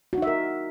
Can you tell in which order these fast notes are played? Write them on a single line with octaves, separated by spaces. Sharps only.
F#4 D#4 E5 A#4